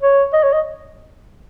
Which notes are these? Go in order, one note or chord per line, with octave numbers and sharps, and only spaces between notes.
C#5
D#5
C#5
D#5